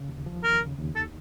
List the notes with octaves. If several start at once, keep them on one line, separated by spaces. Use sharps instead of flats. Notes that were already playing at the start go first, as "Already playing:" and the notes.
Already playing: C#3
D#2
F3
D#2 A#4
C#3
D#2
D#3 A4